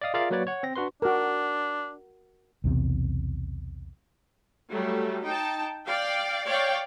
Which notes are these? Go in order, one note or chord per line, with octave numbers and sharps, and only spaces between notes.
D5 D#5 F5 D#6
F4 G#4 A#4 D5 E5 F5
F#3 A#3 F#4 B4 C#5 D5
C#5 F#5
C4 A#6
D4 F#4 B4 C6
D4 F#4 A#4
B1 E2 C3
F#3 G3 A3
D#4 G5 A5
D5 F5 G5
C#5 D5 F5 G5